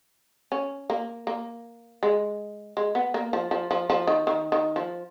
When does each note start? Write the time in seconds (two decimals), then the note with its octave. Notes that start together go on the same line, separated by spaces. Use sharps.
0.52 C#4
0.90 A#3
1.27 A#3
2.03 G#3
2.77 G#3
2.95 B3
3.14 A#3
3.33 F3
3.51 F3
3.71 F3
3.90 F3
4.07 D#3
4.27 D#3
4.52 D#3
4.76 F3